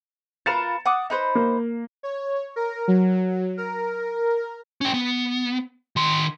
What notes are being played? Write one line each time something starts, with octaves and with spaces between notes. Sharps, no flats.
F4 A#4 B4 A6 C#7 E7
F#5 D6 D#6
D#4 B4 C5
A#3
C#5
A#4
F#3
A#4
C#4 G5
B3
D#3 C6